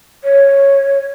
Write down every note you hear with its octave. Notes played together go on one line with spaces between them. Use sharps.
C#5